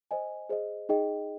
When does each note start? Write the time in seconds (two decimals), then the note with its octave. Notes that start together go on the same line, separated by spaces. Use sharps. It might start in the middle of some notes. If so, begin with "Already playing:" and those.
0.11 C5 D#5 G#5
0.49 G#4 C5 D#5
0.89 D#4 G#4 D#5 G5